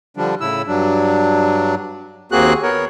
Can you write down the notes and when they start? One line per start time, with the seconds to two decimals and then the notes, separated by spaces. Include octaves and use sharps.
0.17 D3 F3 G3 D4
0.41 A2 C#3 E4 E6
0.67 G2 F#3 D4
2.32 D#2 A#3 C4 F#4 G#4 F#6
2.63 B3 A#4 C#5